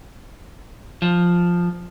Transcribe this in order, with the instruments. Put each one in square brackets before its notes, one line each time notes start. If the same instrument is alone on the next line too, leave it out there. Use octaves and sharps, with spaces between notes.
[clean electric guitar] F3